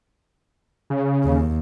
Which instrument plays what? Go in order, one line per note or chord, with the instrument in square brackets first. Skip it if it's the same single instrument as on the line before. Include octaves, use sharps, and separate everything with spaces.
[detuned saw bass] C#3
[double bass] D#2